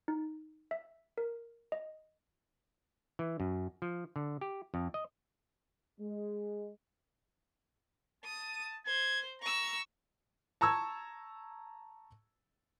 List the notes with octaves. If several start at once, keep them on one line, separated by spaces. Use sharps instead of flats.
D#4
E5
A#4
D#5
E3
F#2
F3
D3
G4
F2
D#5
G#3
A5 D#6
C5 G#6
A#5 C#6 E6
A5 A#5 C#6 E6 G#6